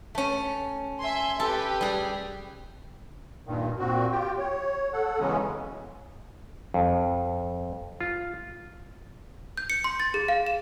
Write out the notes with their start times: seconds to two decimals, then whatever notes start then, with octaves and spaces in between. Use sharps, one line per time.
0.15 A3 C#4
0.99 E5 G#5 C6
1.40 G4 A4 B4
1.81 G3 G#4
3.47 G2 A#2 D#3
3.79 A#2 C4 F#4
4.11 F4 G4 G5
4.38 C#5
4.93 A4 F#5
5.19 C#3 E3 F#3 G#3 B3 C#4
6.74 F2
8.01 F4
9.57 G6
9.70 C#7
9.84 C6
10.00 A6
10.14 G#4
10.28 F5
10.46 E7